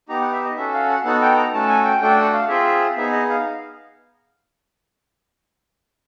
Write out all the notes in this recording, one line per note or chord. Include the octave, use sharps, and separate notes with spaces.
B3 D#4 G4 A#5
F#5
E5
D#5
C#4 F#4 A4 E5
F5
F#5
B3 D#4 F#4 A4 F#5
G5
A#5
A3 C#4 F#4 A4 A5
G#5
G5
A3 D4 F#4 A4 G5
F#5
F5
C4 F4 G#4 E5
B3 D#4 G#4 E5
D#5
F5